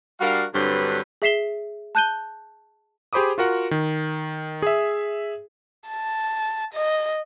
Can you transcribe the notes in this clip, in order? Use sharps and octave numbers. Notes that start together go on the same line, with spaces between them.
G3 D4 F#4 A#4 F5
G2 D3 F#3 C4 B4
G#4 E5 B6 C7 E7 G7
A5 F#6 G6 D#7 G7
G4 G#4 C5 B5 D6 D#6
F4 F#4 A#4 F#5
D#3
G#4 E5
A5
D#5